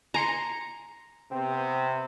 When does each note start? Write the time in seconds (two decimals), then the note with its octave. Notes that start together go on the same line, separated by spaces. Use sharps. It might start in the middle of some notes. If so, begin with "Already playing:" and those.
0.14 G#5 A#5 C6 C#7
1.31 C3 B3 C4